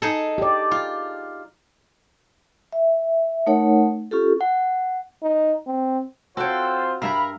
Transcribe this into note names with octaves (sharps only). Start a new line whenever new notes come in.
D#4 G#4 A4
G4 D5
F4
E5
A3 D#4 A#4 C#5 F#5
C#4 F4 G4 A4
F#5
D#4
C4
C4 F4 F#4 A4 C5 C#5 G5
G2 A#4 E5 F5 A#5 B5